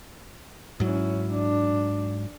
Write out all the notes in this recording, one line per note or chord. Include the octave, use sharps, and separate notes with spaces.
G#2 F#3 C#4 E4
D4